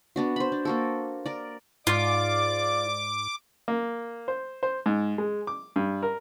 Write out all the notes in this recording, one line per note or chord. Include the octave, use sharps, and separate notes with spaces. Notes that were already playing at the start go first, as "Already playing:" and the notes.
B3 D4 F#4
C5 B5
D4
A#3 F#4 A4
A#4 D5
G#2 F4 D5 D6
A#3
C5
C5
G#2
G#3
D6
G2
A#4